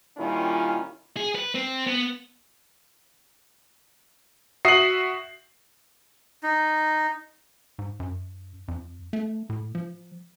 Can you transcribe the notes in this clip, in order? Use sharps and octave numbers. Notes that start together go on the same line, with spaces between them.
A#2 D#3 G3 C#4 E4 F4
G#4
B4
C4
B3
F#4 E5 D#6 C7 F#7
D#4
G#2
F#2
F2
A3
A2
F3